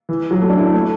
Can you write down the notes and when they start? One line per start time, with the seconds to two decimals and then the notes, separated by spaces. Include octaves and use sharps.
0.09 E3
0.31 F#3
0.42 A3
0.50 D4
0.58 E4
0.66 D4
0.74 A3